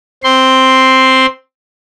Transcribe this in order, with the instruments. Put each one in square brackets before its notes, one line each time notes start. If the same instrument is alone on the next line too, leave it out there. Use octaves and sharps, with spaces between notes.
[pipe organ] C4 C6